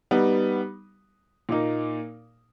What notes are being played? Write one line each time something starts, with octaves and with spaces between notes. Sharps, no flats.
G3 B3 D#4
A#2 A#3 D#4